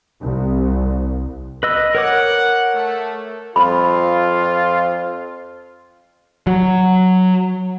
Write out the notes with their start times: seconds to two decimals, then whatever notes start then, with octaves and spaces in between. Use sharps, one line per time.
0.23 C2
1.63 B4 D#5 E6
1.95 A#4 C#5 F#5 D6
2.75 A3
3.56 F2 F4 B5
6.47 F#3